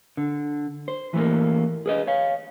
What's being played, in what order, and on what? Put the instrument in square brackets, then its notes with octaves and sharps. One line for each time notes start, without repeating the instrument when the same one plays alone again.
[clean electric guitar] D3
C5
E3 A3 A#3
G#4 B4 D#5
C#5 F5